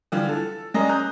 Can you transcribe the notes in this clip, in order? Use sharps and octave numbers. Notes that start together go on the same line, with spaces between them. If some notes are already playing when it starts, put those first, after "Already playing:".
D3 E3 G3 F4
A4
G3 G#3 C#4 G#4 A#4 D#5
A#5 D#6 F#6 G6